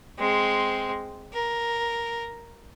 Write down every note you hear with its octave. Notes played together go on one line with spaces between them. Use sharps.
G#3 C4
A#4